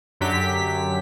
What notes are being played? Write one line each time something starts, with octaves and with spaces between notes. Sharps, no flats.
F#2 D3 F#3 G4 B6